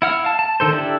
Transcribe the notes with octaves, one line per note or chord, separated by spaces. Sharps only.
E4 F#5 F6
F5 A5
A5
D3 D#3 A4 C5
D4 E4 G4 A4